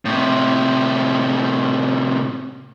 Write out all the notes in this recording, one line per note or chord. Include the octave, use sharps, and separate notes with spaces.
A2 C3